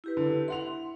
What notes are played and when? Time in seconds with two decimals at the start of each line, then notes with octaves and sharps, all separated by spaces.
0.04 E4 G4 B4
0.17 D3
0.48 E4 F#5 C6 F7